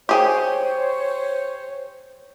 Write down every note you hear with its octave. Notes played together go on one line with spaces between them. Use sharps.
G4 G#4 C5 C#5 G5